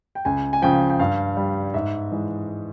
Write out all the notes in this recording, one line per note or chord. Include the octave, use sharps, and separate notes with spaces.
G5
C#2 G#5
G#5
C#3 F3 G5
G5
G2 F5
G3
G#2 E5
E3 G#3